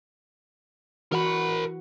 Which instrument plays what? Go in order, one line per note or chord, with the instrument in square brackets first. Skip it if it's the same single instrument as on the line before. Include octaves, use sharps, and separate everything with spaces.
[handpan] E3 F#4 F#5 [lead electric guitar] A#4 B5